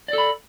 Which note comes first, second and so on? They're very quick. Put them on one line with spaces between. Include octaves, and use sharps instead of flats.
D5 A4 B5